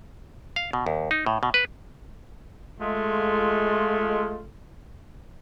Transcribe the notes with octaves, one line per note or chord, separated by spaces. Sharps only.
F5
B2
D#2
D#4
A2
B2
B4
G#3 A3 F4